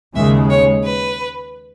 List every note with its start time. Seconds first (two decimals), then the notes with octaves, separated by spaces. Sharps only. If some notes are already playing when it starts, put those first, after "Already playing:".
0.16 D#2 C#3 G#3 E5
0.50 C#5
0.85 B4